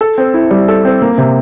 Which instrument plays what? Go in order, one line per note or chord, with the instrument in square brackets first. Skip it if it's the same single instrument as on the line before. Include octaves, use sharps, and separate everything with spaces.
[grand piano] A4
C4
E4
G3
A4
C4
A#3
C3